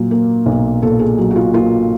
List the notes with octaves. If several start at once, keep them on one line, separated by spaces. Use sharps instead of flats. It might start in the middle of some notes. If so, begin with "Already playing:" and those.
Already playing: A#2 F#3
A#3
B1
A#2 A4
G#4
F#3
F#4
F4
A#3 F4